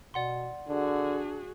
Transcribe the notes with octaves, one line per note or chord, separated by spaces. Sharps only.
B2 D5 F#5 C6
D3 D4 F#4 G#4